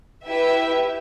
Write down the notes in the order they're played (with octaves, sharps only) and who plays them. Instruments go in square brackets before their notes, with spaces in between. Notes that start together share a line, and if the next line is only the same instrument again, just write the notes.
[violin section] E4 G4 B4 E5